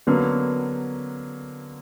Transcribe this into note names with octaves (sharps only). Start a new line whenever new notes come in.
D3 F#3 A#3 B3 C#4